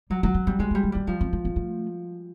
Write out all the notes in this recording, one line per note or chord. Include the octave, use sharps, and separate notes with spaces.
F#3 G3
F#3 A3
B3
G3 B3
G#3 B3
A3
G3
A3
G3 A#3
F3 B3
C4
B3
B3
A3